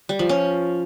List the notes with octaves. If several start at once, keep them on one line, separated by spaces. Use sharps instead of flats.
G3
F3
C#4